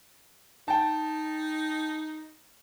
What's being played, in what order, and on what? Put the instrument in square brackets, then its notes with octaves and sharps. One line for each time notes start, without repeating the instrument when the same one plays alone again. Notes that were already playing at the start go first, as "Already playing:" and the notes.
[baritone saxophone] D#4 [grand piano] G5 A5